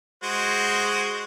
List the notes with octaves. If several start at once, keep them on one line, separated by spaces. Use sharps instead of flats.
G#3 F#4 C5